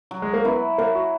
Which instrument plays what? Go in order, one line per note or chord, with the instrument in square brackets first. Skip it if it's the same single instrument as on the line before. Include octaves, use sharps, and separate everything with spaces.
[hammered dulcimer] F#3
[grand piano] G#3
A#3
[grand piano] B3 [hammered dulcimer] E4
[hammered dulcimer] F#3 [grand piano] A#3
[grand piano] F#4